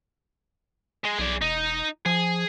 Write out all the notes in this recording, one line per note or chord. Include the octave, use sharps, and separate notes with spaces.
G#3
B1 G#4 D5
E1 D#4
F3 G#4